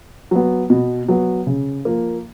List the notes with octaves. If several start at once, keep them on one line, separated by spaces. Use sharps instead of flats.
F#3 B3
B2
F#3 B3
C#3
F3 A#3